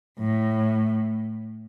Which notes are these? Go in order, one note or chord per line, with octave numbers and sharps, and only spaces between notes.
A2